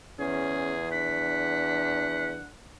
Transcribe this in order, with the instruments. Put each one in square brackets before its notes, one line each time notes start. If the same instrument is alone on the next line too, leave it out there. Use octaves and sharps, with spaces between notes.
[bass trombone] E2 [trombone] C#4 [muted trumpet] G#4
[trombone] D4 [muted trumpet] F#5 [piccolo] B6